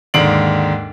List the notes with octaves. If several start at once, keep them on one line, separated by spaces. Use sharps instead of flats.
D#2 G#2 D3 C7 D7 F#7